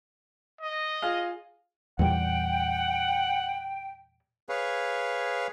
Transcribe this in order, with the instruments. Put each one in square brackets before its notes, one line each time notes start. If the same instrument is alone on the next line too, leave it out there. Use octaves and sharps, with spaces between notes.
[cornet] D#5
[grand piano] F4 G#4 F5
[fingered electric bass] E2 A#2 G3 [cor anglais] F#5 [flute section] G5
[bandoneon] G#4 B4 C#5 F5